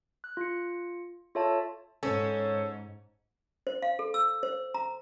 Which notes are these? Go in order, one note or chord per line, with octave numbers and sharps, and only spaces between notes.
F#6
F4 C#7
F4 A4 C#5 E5 A5
G#2 C#4 A4 C5 C#5
C5
F5
A4
E6
C5
A#5